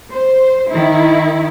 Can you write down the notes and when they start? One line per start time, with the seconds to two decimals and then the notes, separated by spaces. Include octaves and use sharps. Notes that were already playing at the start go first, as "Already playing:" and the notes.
0.12 C5
0.69 D#3 E4